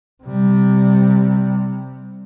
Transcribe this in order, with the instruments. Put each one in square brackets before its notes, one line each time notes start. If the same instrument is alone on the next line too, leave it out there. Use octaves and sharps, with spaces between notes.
[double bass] C3 G3